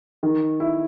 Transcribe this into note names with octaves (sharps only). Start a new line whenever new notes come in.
D#3
E4